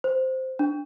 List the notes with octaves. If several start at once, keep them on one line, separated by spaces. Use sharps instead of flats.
C5
D4